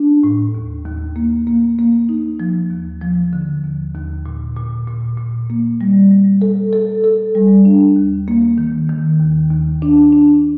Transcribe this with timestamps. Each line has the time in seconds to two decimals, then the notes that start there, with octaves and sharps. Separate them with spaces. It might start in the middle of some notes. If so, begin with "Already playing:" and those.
Already playing: D4
0.23 A2
0.55 D#2
0.86 D#2
1.16 A#3
1.47 A#3
1.79 A#3
2.09 D#4
2.40 F3
2.70 D#2
3.02 F3
3.33 D3
3.64 D#2
3.95 D#2
4.26 A#2
4.56 A#2
4.88 A#2
5.18 A#2
5.50 A#3
5.81 G3
6.11 G3
6.42 A4
6.73 A4
7.04 A4
7.35 G3
7.65 D4
7.96 D#2
8.28 A#3
8.58 D#3
8.89 D#3
9.20 D#2
9.51 D#2
9.82 D4
10.13 D4